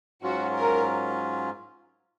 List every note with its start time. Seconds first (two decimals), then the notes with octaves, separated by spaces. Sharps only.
0.22 G#2 F#3 C#4 F4 F#4
0.55 A#4